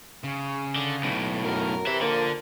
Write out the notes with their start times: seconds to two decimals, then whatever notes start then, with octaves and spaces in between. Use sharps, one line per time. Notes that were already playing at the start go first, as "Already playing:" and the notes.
0.24 C#3
0.76 D3
1.03 B1 A2
1.45 F#2 A#4
1.87 C3 B4 E5
2.01 A#2 D3 F3 A#3